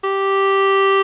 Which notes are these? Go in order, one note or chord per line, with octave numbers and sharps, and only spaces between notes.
G4